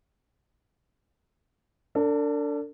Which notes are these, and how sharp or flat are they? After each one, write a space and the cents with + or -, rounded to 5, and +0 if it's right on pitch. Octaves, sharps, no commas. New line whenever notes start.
D4 -15 A4 +40